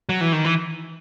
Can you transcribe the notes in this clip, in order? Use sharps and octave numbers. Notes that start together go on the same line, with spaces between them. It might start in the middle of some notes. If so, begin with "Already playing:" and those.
F#3
E3
D#3
E3